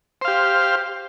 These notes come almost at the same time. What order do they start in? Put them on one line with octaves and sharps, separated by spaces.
C5 F5 G4